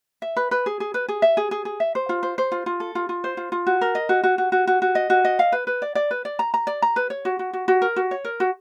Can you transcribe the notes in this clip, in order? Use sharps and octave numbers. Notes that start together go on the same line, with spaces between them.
E5
B4
B4
G#4
G#4
B4
G#4
E5
G#4
G#4
G#4
E5
C5
F4
C5
C5
F4
F4
A4
F4
F4
C5
F4
F4
F#4
A#4
D#5
F#4
F#4
F#4
F#4
F#4
F#4
D#5
F#4
D#5
F5
B4
B4
D5
D5
B4
D5
A#5
A#5
D5
A#5
B4
C#5
F#4
F#4
F#4
F#4
A#4
F#4
C#5
A#4
F#4